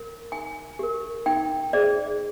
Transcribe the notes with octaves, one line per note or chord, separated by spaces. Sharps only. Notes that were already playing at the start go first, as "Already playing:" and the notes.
Already playing: A#4
D#4 G#5
G4 A#4
D#4 G5
G#4 C5 D5